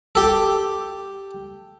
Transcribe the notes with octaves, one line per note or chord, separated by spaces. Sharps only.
G4 A4